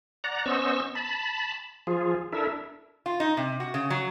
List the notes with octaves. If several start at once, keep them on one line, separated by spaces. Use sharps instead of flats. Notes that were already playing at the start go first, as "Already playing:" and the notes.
D5 F#5 A#5
B3 C#4 C5 D#5 C#6 E6
A5 B5
F3 F4 G#4
D4 E4 A4 A#4 E5
F4
D#4
C3
F#4
C#3
F#3